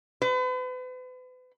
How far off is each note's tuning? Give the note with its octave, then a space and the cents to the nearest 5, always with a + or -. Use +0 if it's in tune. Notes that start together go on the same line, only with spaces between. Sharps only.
B4 +40